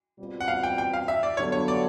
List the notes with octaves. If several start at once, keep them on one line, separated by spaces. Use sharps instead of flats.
B2 G3 C4 F4
F#5
F5
G5
G5
F5
E5
D5
G2 D3 F#3 B3 D4 C#5
C#5
D5